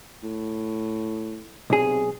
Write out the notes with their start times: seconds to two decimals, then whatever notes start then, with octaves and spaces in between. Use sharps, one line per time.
0.23 A2
1.70 B1 C3 G#4